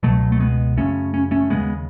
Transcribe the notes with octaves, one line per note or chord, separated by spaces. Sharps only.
C#2 B2 F#3 A3
A3
G#3 B3
F#2 C#3 A3 C#4
C#4
A3 C#4
D#2 C#3 G#3 B3